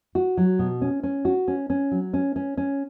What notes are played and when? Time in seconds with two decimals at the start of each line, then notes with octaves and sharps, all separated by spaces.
0.15 F#4
0.37 F#3
0.59 B2
0.82 C#4
1.03 C#4
1.25 F#4
1.48 C#4
1.70 C#4
1.91 F#3
2.14 C#4
2.36 C#4
2.57 C#4